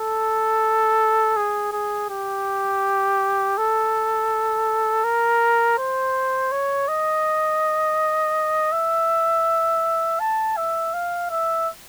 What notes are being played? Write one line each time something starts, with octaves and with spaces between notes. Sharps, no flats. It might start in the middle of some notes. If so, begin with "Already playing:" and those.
Already playing: A4
G#4
G#4
G4
A4
A#4
C5
C#5
D#5
E5
A5
E5
F5
E5